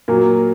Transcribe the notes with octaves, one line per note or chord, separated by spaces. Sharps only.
A#2 F#3 A#3